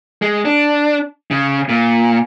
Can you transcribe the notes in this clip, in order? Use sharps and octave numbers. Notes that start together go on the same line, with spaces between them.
G#3
D4
C#3
A#2